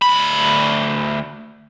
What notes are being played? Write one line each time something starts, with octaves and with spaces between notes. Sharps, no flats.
D2 B5